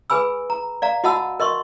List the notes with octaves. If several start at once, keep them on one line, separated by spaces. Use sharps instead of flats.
G#4 B4 G#5 B5 E6
A#5
D5 F5 A#5
F#4 D#5 F#5 A5 B5 E6
A#4 D#5 C6 C#6